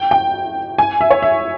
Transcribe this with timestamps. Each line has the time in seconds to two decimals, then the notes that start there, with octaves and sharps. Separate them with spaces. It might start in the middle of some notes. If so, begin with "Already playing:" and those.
Already playing: G5
0.11 G5
0.78 G#5
1.01 E5
1.11 C#5
1.22 E5